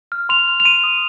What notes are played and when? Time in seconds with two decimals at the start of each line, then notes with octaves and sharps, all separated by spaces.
0.12 F6
0.29 C6 F7
0.48 F6
0.60 F7
0.65 C6 D#7
0.84 D#6